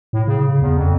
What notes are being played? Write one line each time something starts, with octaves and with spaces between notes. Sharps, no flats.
A2
C#3
E2
F2